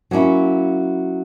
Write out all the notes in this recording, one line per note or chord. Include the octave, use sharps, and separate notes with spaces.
F#3 A#3 C#4 E4